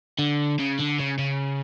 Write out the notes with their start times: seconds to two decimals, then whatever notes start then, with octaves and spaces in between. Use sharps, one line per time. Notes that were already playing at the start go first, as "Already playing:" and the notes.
0.19 D3
0.60 C#3
0.79 D3
0.99 C#3
1.19 C#3